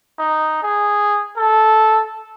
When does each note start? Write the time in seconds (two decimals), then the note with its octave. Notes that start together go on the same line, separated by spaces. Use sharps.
0.18 D#4
0.63 G#4
1.37 A4